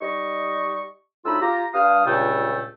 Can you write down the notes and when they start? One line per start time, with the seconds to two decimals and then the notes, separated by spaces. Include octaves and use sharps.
0.01 G3 D#4 D#5 C#6
1.25 D2 A2 D#4 F4 B5 E6
1.41 F4 G4 A#5
1.74 G2 F5 D#6
2.05 C#2 G2 A#2 C#3 A3 G5